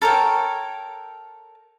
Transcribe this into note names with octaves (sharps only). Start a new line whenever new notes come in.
A4 A#4 C#5 G5